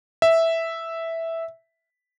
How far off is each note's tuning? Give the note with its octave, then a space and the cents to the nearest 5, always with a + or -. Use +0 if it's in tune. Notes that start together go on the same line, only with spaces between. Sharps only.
E5 -5